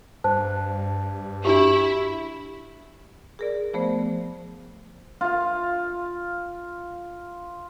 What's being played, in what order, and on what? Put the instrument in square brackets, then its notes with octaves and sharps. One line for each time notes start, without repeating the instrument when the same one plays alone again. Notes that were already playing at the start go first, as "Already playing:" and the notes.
[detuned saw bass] G2 [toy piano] C5 [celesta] A5
[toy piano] D4 F#4 G4 [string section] E4
[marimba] G#4 A#4 D5
F3 A3 B3 C5
[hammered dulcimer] F4 F5